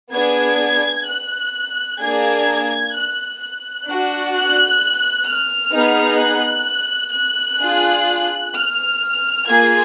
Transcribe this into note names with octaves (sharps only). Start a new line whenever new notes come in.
B3 D4 G#4 G#6
F#6
A#3 D4 G#4 G#6
F#6
F#6
D4 F#4
F#6
F6
B3 D#4 G#4
F#6
F#6
D4 F4 G#4
F6
A#3 F4 G#4 G#6